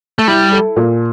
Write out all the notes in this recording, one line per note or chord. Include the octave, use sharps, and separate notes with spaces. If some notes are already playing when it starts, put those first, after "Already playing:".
A3
G3 E4
A4
A#2